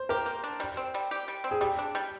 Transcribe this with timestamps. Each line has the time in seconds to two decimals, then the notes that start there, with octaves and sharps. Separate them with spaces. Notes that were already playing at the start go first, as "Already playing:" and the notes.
Already playing: C5
0.09 G4 A#4
0.26 A#3
0.44 D4
0.60 G3
0.77 C4
0.94 G3
1.11 G4
1.28 G3
1.44 C4
1.51 G#4
1.61 G3 G4
1.79 D4
1.95 G3